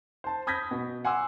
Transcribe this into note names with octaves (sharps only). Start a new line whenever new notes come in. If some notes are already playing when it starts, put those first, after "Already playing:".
C5 A5
B5 D#6 G6 G#6 A#6 B6
B2
F#5 G#5 C6 D6 E6